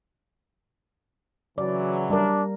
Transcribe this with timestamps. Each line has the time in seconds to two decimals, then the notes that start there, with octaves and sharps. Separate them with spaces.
1.58 C#3 E3 F#3 D5
2.10 G3 D4 A#4